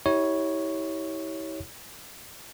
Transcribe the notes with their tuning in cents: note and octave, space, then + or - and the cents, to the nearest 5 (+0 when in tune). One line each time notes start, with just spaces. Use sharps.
E4 -35 G4 -10 C#5 +0